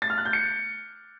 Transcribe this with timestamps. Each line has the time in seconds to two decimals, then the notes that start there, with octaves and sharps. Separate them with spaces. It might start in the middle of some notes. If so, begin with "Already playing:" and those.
0.02 A6
0.10 F6
0.18 F#6
0.25 G6
0.33 C#7